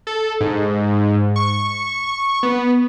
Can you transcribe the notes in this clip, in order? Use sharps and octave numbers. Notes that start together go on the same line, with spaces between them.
A4
G#2
C#6
B3